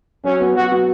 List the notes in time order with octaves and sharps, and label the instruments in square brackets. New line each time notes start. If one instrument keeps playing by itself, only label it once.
[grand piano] F#3 [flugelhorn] C#4
[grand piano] B3 F#4
[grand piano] F#3 [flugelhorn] F#4
[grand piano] B3 F#4